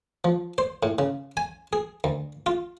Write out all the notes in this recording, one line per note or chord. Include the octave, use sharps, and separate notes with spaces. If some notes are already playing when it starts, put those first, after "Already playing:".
F3
C5
A2
C#3
G#5
G#4
D2
F4